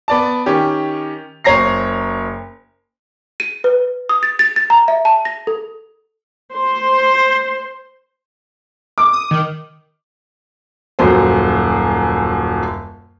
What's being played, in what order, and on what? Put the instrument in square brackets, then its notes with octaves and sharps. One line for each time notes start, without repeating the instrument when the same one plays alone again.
[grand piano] B3 D5 A5
D#3 C#4 G4
F#1 C5 C#5 A#5 A#6 C7
[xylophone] D#7
B4
D#6
A6
A6
A6
A#5
E5
A5
A#6
A4
[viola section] C5
[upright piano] D6
[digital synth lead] D#6
D#3
[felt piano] D#1 F#2 C5